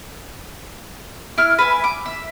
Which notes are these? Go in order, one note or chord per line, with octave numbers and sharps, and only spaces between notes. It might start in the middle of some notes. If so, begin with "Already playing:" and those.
E4 F6
B4 E5 G#5
D6
E5